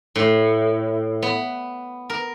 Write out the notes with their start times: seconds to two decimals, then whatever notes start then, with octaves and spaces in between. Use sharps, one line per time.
0.16 A2
1.22 B3
2.10 A#4